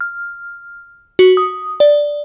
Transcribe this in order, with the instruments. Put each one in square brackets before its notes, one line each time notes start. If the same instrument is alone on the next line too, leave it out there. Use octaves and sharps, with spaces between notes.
[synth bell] F6
F#4
D#6
D5